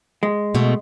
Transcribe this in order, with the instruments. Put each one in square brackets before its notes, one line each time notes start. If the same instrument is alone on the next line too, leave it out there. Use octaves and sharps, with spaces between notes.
[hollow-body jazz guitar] G#3
[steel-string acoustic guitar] B2 A3